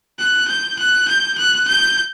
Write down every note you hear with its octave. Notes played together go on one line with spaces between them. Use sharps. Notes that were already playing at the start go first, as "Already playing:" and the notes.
F#6
G6
F#6
G6
F#6
G6